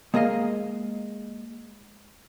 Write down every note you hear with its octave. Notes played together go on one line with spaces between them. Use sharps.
G#3 A#3 G#4 D#5 F5